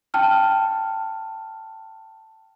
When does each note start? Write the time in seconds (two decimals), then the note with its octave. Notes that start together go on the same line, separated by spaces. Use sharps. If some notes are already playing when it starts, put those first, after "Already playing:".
0.14 G5 A5 F6